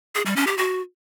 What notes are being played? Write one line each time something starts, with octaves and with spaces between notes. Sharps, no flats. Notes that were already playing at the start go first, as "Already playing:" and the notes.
G#4
G3
C#4
G4
F#4